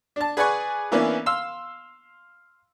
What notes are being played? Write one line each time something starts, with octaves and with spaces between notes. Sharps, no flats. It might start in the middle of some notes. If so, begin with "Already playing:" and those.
D4 A5
G#4 B4 D5 F#5 G#5 C#6
E3 A#3 B3 C#4 D4 E4
F5 C6 E6